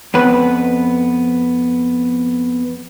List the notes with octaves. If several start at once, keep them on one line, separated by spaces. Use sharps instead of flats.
F2 B3 B4